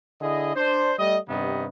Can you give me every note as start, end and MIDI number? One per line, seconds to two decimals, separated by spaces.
0.21 0.55 50
0.21 0.55 64
0.21 0.55 68
0.21 0.55 75
0.55 0.94 62
0.55 0.94 72
0.99 1.18 55
0.99 1.18 57
0.99 1.18 75
1.29 1.66 43
1.29 1.66 48
1.29 1.66 51
1.29 1.66 59
1.29 1.66 75